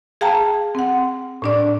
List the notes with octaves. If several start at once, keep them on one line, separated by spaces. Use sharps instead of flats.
G#4 F5 G5 A5 A#5
C4 F#5
A2 D4 D5